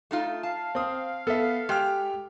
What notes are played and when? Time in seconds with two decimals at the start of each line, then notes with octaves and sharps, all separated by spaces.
0.11 A3 D#4 F4
0.43 F5 A5
0.75 C4 D#6
1.27 B3 A4 E5
1.69 G#3 G4 G5 F6